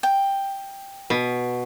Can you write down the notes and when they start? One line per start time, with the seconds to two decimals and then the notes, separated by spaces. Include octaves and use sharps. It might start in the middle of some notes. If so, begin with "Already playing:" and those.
0.03 G5
1.10 B2